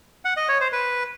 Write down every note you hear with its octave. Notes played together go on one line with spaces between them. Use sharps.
F#5
D#5
C#5
C5
B4